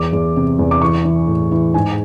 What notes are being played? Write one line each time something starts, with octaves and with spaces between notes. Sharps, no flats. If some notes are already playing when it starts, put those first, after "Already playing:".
Already playing: E2 D6
E2
C3
E2
D6
E3 C#6
E3
A2
E3
G#2 G#5